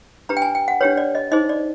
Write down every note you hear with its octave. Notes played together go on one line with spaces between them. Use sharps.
D4 G4 B4 A#5
G5
G#5
G5
F#5
D4 G4 B4 C#5
D5
D#5
D#4 G#4 C5 D#5
D5